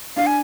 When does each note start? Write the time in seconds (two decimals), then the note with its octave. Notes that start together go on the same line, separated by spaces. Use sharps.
0.16 D4 F5
0.27 G#5